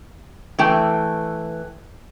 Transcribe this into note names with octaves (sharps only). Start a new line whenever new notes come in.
E3 A3 G5